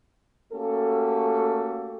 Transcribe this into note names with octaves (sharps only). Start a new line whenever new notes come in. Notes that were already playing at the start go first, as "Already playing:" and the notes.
A3 A#3 C#4 F#4 G4 A4